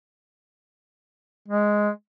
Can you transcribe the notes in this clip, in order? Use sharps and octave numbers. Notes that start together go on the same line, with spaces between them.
G#3